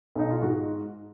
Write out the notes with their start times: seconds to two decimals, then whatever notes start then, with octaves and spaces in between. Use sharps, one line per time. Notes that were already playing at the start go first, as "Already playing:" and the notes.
0.16 B1 D#4
0.31 F4
0.42 G#2 F#4